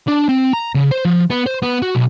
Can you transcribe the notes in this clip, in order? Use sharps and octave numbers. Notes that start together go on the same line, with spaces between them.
D4
C4
A#5
C#3
C5
F3
B3
C5
B3
F#4
B1